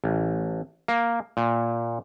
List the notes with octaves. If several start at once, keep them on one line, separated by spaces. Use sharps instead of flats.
A1
A#3
A#2